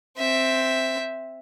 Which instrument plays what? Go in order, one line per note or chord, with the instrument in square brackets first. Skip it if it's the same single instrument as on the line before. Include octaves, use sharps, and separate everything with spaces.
[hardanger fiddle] C4 E5